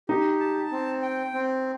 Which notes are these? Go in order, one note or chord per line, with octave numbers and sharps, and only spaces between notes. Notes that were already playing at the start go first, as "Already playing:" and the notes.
D#4 G4
A5
C4
G5
C4